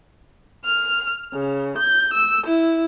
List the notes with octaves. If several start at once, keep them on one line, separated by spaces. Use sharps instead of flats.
F6
C#3
G6
E6
E4